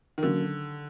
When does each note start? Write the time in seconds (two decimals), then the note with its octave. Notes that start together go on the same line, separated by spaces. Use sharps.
0.18 D#3
0.23 D3 F#3 A#3 C#4